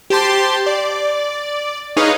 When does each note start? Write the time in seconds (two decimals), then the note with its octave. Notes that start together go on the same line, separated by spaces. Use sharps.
0.10 G4 C5 A5 C6
0.66 D5
1.97 D#4 G#4 B4 C#5 D#5 F5